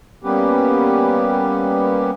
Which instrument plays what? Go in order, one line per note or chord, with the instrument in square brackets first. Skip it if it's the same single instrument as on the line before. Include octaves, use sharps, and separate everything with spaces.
[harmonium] G3 A#3 B3 C#4 G4 B4